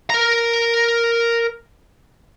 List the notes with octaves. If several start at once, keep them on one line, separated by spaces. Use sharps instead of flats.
A#4 A#5